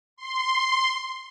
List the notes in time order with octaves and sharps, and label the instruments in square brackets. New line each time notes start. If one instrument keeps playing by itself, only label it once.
[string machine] C6